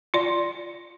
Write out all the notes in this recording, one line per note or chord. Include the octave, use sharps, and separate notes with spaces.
F4 D5